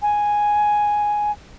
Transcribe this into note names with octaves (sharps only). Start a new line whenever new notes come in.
G#5